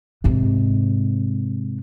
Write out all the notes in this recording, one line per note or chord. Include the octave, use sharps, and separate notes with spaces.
G#2 C3